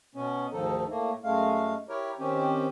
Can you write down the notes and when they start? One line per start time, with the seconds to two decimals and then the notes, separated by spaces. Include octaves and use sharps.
0.15 B2 B3 C#4
0.52 D2 G#2 D#3 F3 D#4 A4
0.90 A2 A3 A#3
1.24 F#2 G#3 A3 F5
1.89 E4 G4 A#4 C#5
2.19 D#3 C4 C#4 G4